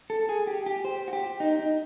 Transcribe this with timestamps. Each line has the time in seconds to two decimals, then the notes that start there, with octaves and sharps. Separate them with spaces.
0.10 A4
0.29 G#4
0.47 G4
0.66 G4
0.85 C5
1.08 F#4
1.13 G4
1.40 D#4
1.59 D#4